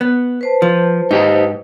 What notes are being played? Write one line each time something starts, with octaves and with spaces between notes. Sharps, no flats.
B3
B4 C5 A5
F3
G#2 D#4 G4 D#5